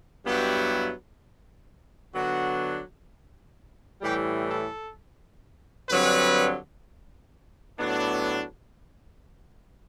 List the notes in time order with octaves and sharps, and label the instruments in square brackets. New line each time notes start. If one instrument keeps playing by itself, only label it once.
[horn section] G2 F#3 B3 E4 G4
D3 F#3 B3 D4 F#4
A2 E3 G3 G4
A4
G2 D3 F#3 C4 B4
A2 F#3 B3 D4